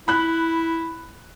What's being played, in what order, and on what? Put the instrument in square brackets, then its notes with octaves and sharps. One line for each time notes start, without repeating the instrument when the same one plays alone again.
[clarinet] E4 [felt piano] B5 F#6